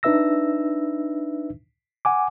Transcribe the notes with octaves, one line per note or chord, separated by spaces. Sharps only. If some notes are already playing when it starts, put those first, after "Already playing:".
D4 D#4 B4 E5 E6 A#6
F#5 G#5 D6